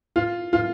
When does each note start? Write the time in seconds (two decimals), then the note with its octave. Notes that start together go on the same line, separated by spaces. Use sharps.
0.16 F4
0.53 F4